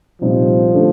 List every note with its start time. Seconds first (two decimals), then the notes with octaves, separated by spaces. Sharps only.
0.21 C2 A#2 F3 G3 C4 D#4
0.73 D3 A3 D4